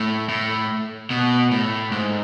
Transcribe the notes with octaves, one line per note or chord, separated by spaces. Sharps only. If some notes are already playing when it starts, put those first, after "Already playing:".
Already playing: A2
A2
B2
A2
G#2